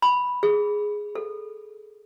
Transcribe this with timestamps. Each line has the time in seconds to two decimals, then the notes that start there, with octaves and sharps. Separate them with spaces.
0.02 B5
0.43 G#4
1.15 A4